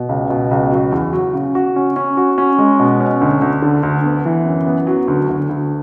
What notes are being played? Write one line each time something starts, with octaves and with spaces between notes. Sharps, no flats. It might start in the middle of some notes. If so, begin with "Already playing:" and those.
Already playing: B2
C#2
B2
C#2
F#3
E2
F#3
C#3
F#4
C#4
C#4
F#4
C#4
G#3
B2
C#4
D2
D2
D3
D2
B3
E3
F#2
B3
F#3
D2
D2
D2